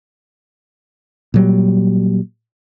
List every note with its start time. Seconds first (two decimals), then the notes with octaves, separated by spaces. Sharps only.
1.34 A#2 F#3 G3